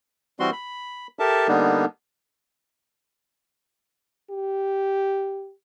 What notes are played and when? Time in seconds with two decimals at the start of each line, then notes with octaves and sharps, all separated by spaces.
0.40 E3 G3 C4 F#4 C6
0.52 B5
1.19 G4 A4 A#4 E5 A5
1.48 D3 G3 A#3 B3 D4 D#4
4.31 G4